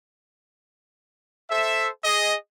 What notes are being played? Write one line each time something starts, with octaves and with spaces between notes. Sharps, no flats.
A4 C5 E5
G#4 D#5